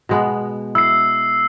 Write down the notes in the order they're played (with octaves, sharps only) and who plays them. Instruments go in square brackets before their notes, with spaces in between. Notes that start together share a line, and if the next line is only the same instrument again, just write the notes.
[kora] B2 G#3 B3
[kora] E4 [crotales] E6 C7